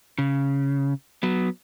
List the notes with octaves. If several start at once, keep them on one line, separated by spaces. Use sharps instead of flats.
C#3
F#3 B3